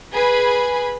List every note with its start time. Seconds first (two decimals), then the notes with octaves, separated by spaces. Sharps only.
0.13 G#4 B4 G#5 B5